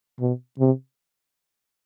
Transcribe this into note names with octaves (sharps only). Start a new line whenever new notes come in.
B2
C3